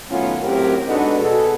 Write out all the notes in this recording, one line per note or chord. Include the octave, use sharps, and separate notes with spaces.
D#3 F#3 A3 B3 C#4 F4
F#2 A2 F#3 C4 G4 A#4
G#3 B3 D4 D#4 F#4 A4
B2 G#4 A4